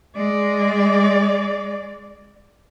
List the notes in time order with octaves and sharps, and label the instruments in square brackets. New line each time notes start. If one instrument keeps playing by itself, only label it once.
[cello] G#3 D5